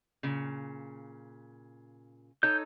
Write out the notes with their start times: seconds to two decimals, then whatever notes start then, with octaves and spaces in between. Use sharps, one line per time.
0.23 A#2 C#3
2.43 D#4 A4 C#5 G6